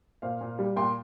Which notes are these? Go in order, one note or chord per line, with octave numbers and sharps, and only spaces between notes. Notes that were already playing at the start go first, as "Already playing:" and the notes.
A#2 C5 F5
A#2
G3
A#2 G5 C6